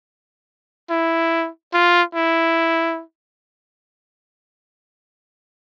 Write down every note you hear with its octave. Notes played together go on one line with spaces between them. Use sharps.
E4
F4
E4